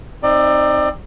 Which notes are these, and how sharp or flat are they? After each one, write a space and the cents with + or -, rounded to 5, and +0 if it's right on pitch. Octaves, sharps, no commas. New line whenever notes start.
C4 +15 D#4 +0 D5 +25